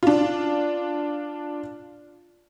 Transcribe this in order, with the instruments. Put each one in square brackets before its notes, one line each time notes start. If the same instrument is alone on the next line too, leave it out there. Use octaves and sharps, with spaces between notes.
[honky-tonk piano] D4 F4